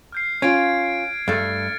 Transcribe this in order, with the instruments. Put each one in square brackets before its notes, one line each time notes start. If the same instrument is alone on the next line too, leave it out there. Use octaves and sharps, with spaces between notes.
[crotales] F6 G6 C7
[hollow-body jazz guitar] C#4 F4 [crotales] G#6 D7
[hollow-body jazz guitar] G2 A3 [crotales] F6 A6 C#7